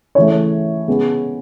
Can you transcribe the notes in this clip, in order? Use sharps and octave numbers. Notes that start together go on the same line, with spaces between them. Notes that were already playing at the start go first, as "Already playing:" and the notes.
C#3 E3 A3 C#5
C#3 G#3 B3